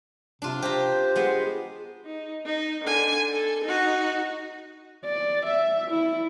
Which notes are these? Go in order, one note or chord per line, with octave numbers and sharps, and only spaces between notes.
C3 D4 F4
G4 C5 A#5
G#3 B3
D#4
D#4
D3 G#5
A4
D#4 F#4
D5
E5
E4